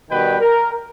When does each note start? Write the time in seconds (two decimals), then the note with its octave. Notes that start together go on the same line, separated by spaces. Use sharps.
0.10 B2 D#3 G3 D#4 B4 G5
0.40 A#4